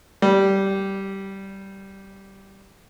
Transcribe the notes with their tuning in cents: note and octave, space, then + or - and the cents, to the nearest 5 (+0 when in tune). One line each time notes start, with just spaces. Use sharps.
G3 -10